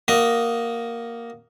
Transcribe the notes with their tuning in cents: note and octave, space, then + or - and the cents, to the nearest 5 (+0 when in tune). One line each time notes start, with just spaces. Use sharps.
A#3 +0 F#4 +20 D#5 +0